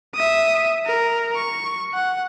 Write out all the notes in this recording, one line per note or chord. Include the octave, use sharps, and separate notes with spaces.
E5 D#6
A#4
C#6
F#5